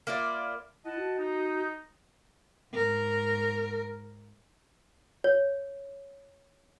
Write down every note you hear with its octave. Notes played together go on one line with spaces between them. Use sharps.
A#3 E4 F4 D5
E4 D#5 F#5 A5
F#4
D#4
G#2 A#4
C#5